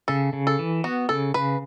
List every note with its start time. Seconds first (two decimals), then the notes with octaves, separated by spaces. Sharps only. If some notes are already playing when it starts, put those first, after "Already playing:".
0.08 C#3 A4
0.33 C#3
0.47 A4
0.59 E3
0.84 B3 F#4
1.09 C#3 A4
1.34 C#3 B4